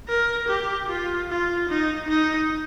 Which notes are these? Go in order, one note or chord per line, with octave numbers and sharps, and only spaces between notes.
A#4
G4
F4
F4
D#4
D#4